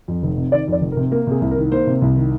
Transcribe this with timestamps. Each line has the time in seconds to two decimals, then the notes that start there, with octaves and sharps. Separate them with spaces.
0.08 F2
0.23 F1
0.37 C3
0.52 D#3 D5
0.68 F2 D5
0.81 F1
0.92 A#4
0.97 C3
1.12 A#3 A#4
1.27 C3 G#4
1.42 C2
1.51 A#4
1.56 D#3
1.72 A#3 C5
1.87 C3
2.02 C2
2.16 D#3